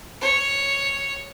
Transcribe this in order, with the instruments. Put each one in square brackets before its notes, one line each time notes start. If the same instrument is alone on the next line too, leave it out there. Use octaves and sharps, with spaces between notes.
[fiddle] C#5